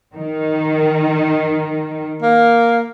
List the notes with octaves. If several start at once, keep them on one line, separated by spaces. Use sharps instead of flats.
D#3
A#3